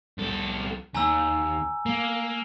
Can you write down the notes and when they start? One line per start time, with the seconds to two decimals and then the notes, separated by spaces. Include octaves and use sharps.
0.18 C2 A4
0.95 D#2 G#5 A#5 E6
1.86 A#3